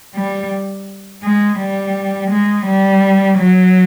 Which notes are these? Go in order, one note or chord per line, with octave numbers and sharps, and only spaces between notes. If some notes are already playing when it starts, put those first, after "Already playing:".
G3
G#3
G3
G#3
G3
F#3